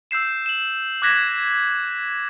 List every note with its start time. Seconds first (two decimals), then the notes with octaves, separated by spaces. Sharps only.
0.11 E6 G6 C7 E7
0.46 E7 F#7
1.02 D6 F#6 G#6 A#6 B6 E7